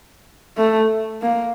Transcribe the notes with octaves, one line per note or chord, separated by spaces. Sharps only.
A3
A#3